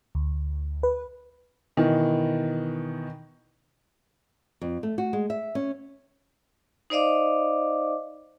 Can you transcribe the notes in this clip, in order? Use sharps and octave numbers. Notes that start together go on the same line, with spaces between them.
D2
B4
B2 D#3 E3
F2
A3
F#4
G#3
E5
C#4
D#4 C5 D5 D#5 F5 D6